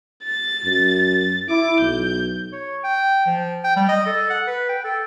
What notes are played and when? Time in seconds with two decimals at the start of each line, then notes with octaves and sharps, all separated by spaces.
0.24 A6
0.65 F#2
1.49 E4 D6
1.80 B1 G6
2.52 C#5
2.84 G5
3.26 F3
3.64 G5
3.76 G3
3.89 D#5
4.06 A4
4.30 F#5
4.47 B4
4.69 G5
4.84 A4